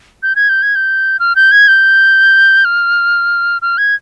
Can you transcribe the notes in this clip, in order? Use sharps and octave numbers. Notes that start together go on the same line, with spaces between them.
G6
G#6
G6
G#6
G6
F6
G6
G#6
G6
F6
F6
G#6